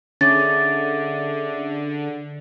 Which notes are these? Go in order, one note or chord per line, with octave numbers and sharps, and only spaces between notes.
D3 C#4 G#4 E5 D6 A6